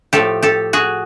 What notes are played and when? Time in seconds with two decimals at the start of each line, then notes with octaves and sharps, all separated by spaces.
0.13 A2 F3 A3 G4 A4
0.43 G4 A4
0.73 F#4 G#4